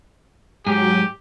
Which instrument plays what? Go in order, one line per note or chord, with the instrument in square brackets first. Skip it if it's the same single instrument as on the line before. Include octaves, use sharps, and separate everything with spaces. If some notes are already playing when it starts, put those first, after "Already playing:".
[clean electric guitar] G#2 G#4 [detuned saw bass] F#3 [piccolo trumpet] G4